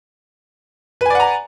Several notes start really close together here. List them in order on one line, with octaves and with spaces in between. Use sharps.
B4 G#5 D5 F#5 A#5